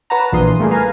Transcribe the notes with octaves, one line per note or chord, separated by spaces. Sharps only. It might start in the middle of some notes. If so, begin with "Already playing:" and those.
B4 C#5 F#5 A5 A#5
A#1 A#2 E3 F4 C6 D#6
G3 A3 A#3 G#4
B4 F5 G#5 A#5